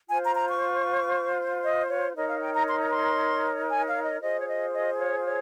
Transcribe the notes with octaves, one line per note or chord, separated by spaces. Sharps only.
F4 C5 G#5
A#5
A#5
C#6
D#5
C#5
D#4 A#4 C#5 D#5
F5
G5
A#5
C6
A#5
C6
G#5
F5
D#5
F4 G#4 C5 D#5
C#5
D#5
D#5
C#5
C#5